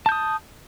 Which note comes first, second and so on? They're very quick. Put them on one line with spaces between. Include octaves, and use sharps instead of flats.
A5 G6 D#6